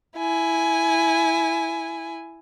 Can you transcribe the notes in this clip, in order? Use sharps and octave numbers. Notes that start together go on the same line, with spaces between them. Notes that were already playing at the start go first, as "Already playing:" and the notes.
E4 G#5